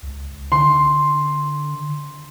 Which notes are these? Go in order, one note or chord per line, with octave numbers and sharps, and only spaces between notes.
C#2
D3 C6